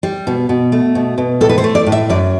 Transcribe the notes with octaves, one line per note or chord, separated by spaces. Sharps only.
G3
B2
B2
A3
B2
B2
A2 A4
B4
C5
A3
D5
A2
E5
F#2 D5